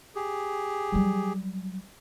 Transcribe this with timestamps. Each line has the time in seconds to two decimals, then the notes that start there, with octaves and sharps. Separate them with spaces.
0.15 G4 G#4
0.92 F#3 G3